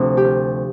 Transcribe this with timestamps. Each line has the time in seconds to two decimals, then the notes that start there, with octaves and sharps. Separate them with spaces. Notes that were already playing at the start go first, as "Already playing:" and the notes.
Already playing: D2 C3 F3
0.17 G4
0.24 F4